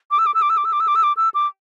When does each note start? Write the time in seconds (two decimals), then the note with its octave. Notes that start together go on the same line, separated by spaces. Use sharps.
0.11 D6
0.19 E6
0.26 D6
0.34 E6
0.42 D6
0.50 E6
0.57 D6
0.65 E6
0.73 D6
0.80 E6
0.88 D6
0.95 E6
1.03 D6
1.17 E6
1.34 D6